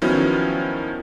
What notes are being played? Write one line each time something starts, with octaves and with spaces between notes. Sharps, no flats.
D#3 F3 F#3 B3 C#4 E4